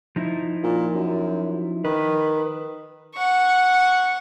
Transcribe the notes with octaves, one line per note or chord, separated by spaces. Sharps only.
F3 D#4 E4
A#2
F#2
D#3 B4
F#5 C#6